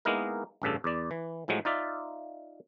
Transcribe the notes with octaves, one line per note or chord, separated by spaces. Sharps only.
G#3 A#3 B3 D#4 E4 A#4
A1 G2 C#3 A4
E2 D5
E3
A2 F3 F#3 G#3
D#4 F4 D5 E5